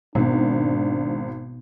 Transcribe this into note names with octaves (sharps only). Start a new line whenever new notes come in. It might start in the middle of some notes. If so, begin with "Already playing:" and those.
G#1 B2 B3 D4